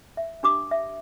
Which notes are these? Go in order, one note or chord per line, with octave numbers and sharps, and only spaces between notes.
E5
D4 G4 D6 D#6
E5